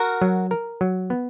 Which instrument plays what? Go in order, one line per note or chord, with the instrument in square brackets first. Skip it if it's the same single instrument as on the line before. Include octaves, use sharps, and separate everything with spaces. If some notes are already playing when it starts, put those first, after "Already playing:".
Already playing: [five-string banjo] F#4 A#4
[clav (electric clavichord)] F#3
A#4
F#3
B3